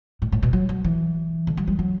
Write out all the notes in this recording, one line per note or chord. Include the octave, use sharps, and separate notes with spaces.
A2
A2
B2
F#3
F#3
E3
D3
F#3
G3
F#3